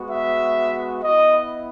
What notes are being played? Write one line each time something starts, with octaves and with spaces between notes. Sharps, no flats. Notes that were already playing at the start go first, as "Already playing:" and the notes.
Already playing: G#3 B3 F#4
E5
B3 E4 D#5